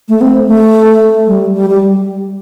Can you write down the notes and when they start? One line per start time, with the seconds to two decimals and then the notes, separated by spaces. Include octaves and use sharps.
0.09 A3
0.21 C4
0.47 A3
1.27 G3
1.54 G3
1.70 G3